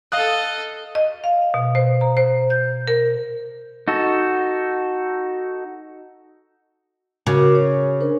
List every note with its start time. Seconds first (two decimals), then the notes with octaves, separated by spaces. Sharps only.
0.12 A4 D#5 F5 D#6 F#6
0.95 D#5
1.24 F5
1.54 B2
1.75 C5
2.01 A#5
2.17 C5
2.50 G6
2.88 A#4
3.88 D#4 F#4 A4
7.27 C#3 F#4 A#4 D6
7.55 C#5
8.01 D4 A#4 C5